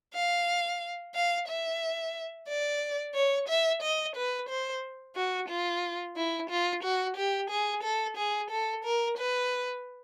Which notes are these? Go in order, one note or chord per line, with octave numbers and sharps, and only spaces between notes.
F5
F5
E5
D5
C#5
E5
D#5
B4
C5
F#4
F4
E4
F4
F#4
G4
G#4
A4
G#4
A4
A#4
B4